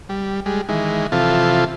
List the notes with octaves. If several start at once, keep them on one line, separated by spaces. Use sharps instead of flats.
G3
G3 G#3
D#3 E3 G#3
C3 E3 F3 F4 A4